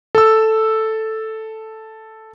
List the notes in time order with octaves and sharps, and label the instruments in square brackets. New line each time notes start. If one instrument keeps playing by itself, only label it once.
[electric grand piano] A4 E6